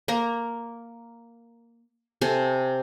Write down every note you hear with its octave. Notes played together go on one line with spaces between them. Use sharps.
A#3 A#4 A#5
C3 A4 G#5